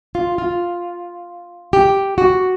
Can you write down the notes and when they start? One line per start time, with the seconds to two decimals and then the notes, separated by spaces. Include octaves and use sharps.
0.15 F4
0.38 F4
1.73 G4
2.18 F#4